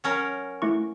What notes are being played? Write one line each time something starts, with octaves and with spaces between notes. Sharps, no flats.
F#3 C#4 A#4
A3 E4 C#6